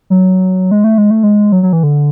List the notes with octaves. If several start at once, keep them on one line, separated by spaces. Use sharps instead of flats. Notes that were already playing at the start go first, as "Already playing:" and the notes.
F#3
G#3
A3
G#3
A3
G#3
F#3
F#3
E3
D3